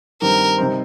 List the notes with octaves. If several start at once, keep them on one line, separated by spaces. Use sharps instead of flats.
G2 D#3 G3 C4 A#4
C3 G3 D#4 C5